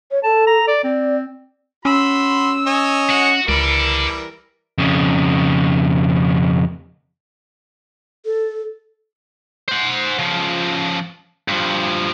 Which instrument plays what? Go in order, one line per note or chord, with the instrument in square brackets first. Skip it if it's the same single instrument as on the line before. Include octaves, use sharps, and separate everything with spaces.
[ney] C#5
[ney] A4 [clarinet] A5
[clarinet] A#5
D5
[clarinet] C4 [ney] D5
[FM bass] C#4 [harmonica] F#4 B5 C6 [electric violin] E6
[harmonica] C#5 D#5 G#5
[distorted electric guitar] F#4 [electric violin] F#5
[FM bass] C#2 [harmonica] E3 G3 [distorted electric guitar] A4 D5 [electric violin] A#4
[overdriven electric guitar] F2 C#3
[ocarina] A4
[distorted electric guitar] C5 F#5
C#3 F3
G2 F3